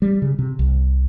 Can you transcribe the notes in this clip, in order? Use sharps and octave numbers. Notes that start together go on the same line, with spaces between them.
G3
C#3
C3
C2